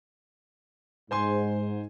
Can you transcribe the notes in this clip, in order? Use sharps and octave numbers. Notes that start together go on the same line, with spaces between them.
G#2 C5 G#5 C6